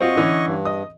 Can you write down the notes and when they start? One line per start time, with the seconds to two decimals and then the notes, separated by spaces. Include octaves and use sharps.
0.01 C4 F4 F#4 D#5 C#6
0.16 D3 E3 C#4
0.47 G2
0.65 D#5 D#6